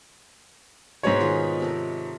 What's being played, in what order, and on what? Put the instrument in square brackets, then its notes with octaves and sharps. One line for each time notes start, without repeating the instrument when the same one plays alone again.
[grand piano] G#2 C#5 [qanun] B2 G#3 D5
[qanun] D#3 F4 G#4
C3 A4 A#4